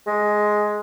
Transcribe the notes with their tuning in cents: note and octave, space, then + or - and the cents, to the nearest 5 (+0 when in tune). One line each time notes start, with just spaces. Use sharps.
G#3 +10